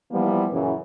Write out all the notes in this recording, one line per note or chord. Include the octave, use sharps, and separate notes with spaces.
E3 F3 G3 A#3 B3 F4
F#2 A#2 C#3 E3